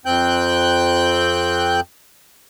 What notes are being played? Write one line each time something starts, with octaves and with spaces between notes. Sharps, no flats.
F2 C4 G5 F#6 G6